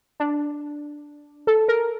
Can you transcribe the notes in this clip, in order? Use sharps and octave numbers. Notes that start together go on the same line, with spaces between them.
D4
A4
A#4